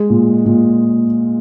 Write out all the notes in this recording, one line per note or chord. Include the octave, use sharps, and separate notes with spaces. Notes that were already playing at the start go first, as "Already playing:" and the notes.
Already playing: G#3
A#2
A#2